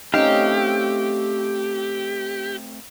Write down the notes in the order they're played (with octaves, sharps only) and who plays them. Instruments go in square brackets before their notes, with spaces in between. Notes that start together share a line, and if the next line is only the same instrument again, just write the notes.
[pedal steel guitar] A3 C4 F5 [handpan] C#4 D#4 [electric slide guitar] G4